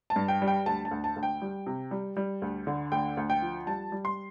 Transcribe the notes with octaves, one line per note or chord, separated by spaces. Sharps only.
A5
G2
G5
G3
G5
D2 A5
A5
D2
A5
D2
G5
G3
C3
G3
G3
D2
D3
D2 G5
D2
G5
F3
G3 A5
G3
C6